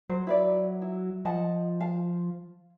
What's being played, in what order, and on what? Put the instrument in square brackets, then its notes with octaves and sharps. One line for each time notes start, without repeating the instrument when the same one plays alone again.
[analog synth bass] F#3 [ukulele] C5
[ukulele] E4 B4 D5
E4
[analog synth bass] F3 [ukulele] D#5 F#5 A5
[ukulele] F5 A5